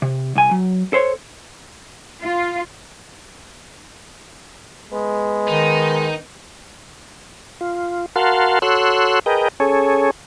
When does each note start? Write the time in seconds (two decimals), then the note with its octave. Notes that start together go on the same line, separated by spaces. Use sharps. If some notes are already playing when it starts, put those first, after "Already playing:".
0.02 C3
0.35 C2 G#5
0.51 F#3
0.93 A4 C5 C#5
2.23 F4
4.92 G#3 B3
5.48 D#3 D#4
7.61 F4
8.16 F#4 A#4 F5 F#5 A5 C6
8.62 F#4 A4 C#5 C6 E6 F#6
9.26 G#4 A#4 B4 D#5 G5
9.60 C#4 G#4 A4 C#5